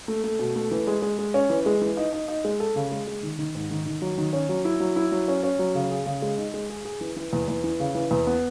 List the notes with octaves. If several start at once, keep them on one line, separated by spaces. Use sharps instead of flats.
A3
A3
B2
A3
E3
G#3
G#3
G#3
C#4
E3
G#3
E3
D#4
D#4
D#4
G#3
A4
C#3
G#3
G#3
D#3
D#3
G#2
D#3
D#3
F#3
D#3
C#4
F#3
E4
F#3
E4
F#3
C#4
C#4
F#3
C#3
G#4
C#3
G#3
D#4
G#3
G#4
G#4
E3
E3
E2
E2
E3
C#3
E3
E2
B3